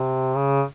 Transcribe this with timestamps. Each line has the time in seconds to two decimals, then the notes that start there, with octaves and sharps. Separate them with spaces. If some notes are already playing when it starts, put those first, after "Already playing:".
Already playing: C3
0.35 C#3